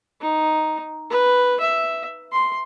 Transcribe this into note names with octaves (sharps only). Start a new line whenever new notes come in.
D#4
B4
E5
C6